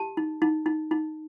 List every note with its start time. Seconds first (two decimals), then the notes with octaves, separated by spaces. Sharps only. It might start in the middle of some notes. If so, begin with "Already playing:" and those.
Already playing: G4 A5
0.17 D#4
0.42 D#4
0.66 D#4
0.91 D#4